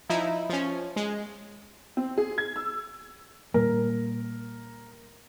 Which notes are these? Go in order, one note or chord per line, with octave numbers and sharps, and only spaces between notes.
F3 D#4 E4
F3 C#4
G#3
C4
G#4
G#6
E6
A#2 G3 A#3 A#4